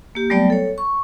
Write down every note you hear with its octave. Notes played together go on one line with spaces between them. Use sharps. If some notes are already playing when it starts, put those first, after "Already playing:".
A#3 G4
F#3 G3 A3 B3 D5 G5
A4 C#5
C#6